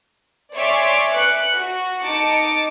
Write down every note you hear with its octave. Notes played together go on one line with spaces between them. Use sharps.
C#5 D5 E5 G#5 C6 D6
B4 F#6 C#7
F#4
D#4 A5 D6 C#7